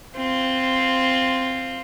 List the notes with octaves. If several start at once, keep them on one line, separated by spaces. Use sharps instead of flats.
C4 F4